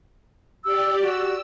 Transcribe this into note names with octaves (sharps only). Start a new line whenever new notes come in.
G4 D5 E6
F#4 E6